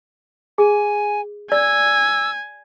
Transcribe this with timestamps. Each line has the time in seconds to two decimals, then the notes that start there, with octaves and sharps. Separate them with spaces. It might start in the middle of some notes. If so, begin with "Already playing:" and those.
0.58 G#4 G#5
1.52 D5 G#5 E6